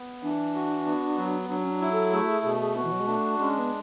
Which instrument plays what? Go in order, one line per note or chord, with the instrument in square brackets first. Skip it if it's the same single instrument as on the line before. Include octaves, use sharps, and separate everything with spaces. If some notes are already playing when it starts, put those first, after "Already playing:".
Already playing: [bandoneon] B3
[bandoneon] E3 [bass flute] D4
[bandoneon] F#4
B3
F#3
[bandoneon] F#3 [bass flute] D4
[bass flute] C#4
D4
[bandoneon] E4
[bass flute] A4
[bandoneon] A3 [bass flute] G#4
[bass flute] F#4
G#4
[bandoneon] B2 [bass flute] G#4
[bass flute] G#4
[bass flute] B3 [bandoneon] F#4
[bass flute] E3
F#3
G#3
[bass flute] A3 [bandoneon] D4
[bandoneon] G#3 [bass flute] C#4
[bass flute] B3